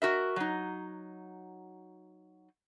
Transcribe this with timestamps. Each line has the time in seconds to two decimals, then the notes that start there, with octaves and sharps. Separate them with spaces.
0.02 F#4 A#4 E5
0.36 F#3 D#4